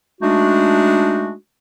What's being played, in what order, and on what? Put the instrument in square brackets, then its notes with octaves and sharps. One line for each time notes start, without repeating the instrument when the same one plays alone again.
[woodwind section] G#3 A3 D4 D#4 F#4